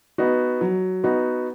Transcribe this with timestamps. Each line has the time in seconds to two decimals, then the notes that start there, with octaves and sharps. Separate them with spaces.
0.18 B3 D#4 F#4
0.61 F#3
1.04 B3 D#4 F#4